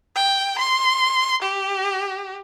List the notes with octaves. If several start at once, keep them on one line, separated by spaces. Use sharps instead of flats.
G5
C6
G4